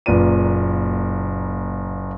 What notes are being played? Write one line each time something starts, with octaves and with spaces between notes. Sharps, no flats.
F#1 A#2 F4 B4 D5 D#7